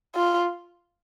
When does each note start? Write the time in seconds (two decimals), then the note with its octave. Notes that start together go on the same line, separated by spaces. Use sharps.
0.15 F4